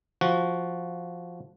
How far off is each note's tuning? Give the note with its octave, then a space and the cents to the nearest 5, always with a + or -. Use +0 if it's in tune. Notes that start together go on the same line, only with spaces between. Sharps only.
F3 +0 F#4 +0